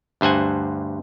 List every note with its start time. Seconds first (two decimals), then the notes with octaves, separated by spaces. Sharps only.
0.21 D2 G2 C5 F#5 G#5